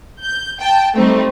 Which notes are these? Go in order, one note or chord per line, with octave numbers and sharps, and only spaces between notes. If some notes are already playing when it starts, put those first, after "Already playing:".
G6
G5 A5
G3 A3 C4 D#4